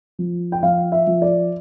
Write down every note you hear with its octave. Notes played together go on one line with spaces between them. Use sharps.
F3
G5
F3 F5
E5
F3
D5